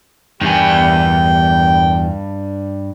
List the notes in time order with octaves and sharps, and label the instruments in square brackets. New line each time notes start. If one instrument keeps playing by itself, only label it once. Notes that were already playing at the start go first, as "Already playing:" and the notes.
[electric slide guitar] E2 G#5 [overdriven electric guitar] G2 [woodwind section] D#3 G4 G5